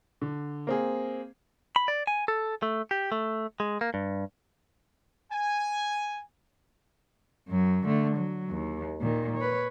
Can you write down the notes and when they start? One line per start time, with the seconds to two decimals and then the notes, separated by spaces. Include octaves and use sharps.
0.22 D3
0.67 A#3 C4 G#4
1.76 B5
1.88 D5
2.07 G#5
2.28 A4
2.63 A3
2.91 G4
3.12 A3
3.60 G#3
3.81 A#3
3.94 G2
5.32 G#5
7.48 F#2 F#3
7.85 D3 A3
8.17 F#3
8.49 D#2
9.01 A#2 D#3
9.37 B4 C#5